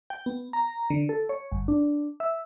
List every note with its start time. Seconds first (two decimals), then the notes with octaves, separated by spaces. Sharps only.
0.10 G5
0.26 B3
0.53 A#5
0.90 D3
1.09 A4
1.29 C#5
1.51 G1
1.68 D4
2.20 E5